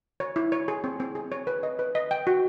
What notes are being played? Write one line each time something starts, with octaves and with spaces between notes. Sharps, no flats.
C#5
E4
C#5
G#4
C4
C4
G#4
C#5
B4
D#5
B4
D#5
G5
F#4